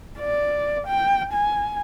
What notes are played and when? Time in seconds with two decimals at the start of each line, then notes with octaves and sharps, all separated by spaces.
0.20 D5
0.87 G5
1.33 G#5